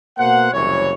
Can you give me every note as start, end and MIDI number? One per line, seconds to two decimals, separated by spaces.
0.18 0.47 47
0.18 0.47 58
0.18 0.47 72
0.18 0.47 78
0.53 0.92 30
0.53 0.92 36
0.53 0.92 52
0.53 0.92 73